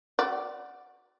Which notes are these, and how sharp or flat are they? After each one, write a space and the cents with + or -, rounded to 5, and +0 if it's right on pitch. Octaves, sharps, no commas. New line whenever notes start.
F#4 -10 D5 +5 F#5 +45